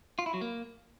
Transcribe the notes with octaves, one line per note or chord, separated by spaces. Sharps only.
F4
E4
F#3
A#3